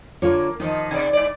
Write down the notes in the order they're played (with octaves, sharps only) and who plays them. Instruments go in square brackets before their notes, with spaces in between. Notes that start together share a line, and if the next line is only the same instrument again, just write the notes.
[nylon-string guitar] D3 F4 C#5 [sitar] A#3
[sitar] D#3 F3 [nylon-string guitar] D#4
[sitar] C3 D5
G#2 D5